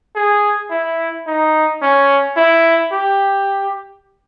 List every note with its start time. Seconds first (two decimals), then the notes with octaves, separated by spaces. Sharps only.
0.15 G#4
0.71 E4
1.27 D#4
1.82 C#4
2.37 E4
2.92 G4